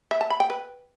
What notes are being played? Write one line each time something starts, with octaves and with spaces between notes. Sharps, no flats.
E5
A5
B5
G5
B4